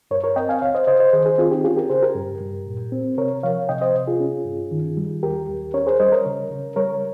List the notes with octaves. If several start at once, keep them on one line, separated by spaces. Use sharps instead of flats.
G2 A#4 C#5
A#4 C#5
C4 D#5 G5
F5 G#5
C#2 C#5 F5
C5 D#5
C#3 C5 D#5
C5 D#5
D#3 G#4 C5
G#4 C5
C4 F4 G#4
D#4 G4
C#4 F4 G#4
G4 A#4
C#3 G#4 C5
G4 A#4
G2
G2
A#2
C4
C3 A#4 C#5
F3 C#5 F5
C3 D#5 G5
C5 D#5
C3
F4 G#4
C#4
G2
D#3
G3
D#2 G4 A#4
D#2
C#4 A#4 C#5
G#4 C5
G3 C5 D#5
A#4 C#5
C#3
C#3
G3 A#4 C#5